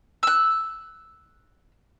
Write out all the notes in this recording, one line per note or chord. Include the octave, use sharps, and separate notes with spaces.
E6 F#6